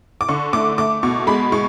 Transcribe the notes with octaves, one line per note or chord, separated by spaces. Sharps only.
D6
D3 C#6
A3 D6
A3 D6
B2 C#6
G#3 B5
G#3 C#6